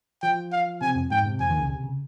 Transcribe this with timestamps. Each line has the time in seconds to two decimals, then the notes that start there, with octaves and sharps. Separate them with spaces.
0.22 F3 F4 G5
0.52 F5
0.81 C3 C4 G#5
0.95 F2 F3
1.11 G#2 G#3 G5
1.25 C3 C4
1.40 F2 F3 G#5
1.50 D#2 D#3
1.59 C#2 C#3
1.70 C3
1.84 C#3